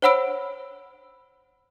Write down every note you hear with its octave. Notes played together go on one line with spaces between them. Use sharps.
C5 C#5 F#5 B5 E6 D7